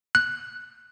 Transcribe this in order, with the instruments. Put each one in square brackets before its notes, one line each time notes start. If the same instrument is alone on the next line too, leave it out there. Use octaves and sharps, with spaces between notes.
[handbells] F#6